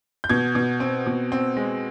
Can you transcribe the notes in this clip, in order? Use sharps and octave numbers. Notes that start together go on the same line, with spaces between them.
G6
B2 G#6
B2
C4
B2
C4
G#3